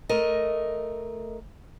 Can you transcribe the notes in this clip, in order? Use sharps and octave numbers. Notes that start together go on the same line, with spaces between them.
A3 A#4 D#5